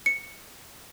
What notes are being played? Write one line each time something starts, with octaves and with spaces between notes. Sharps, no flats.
C#7